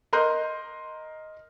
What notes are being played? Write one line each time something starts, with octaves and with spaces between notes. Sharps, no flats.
A#4 D#5 A#5 C6 F#6 G6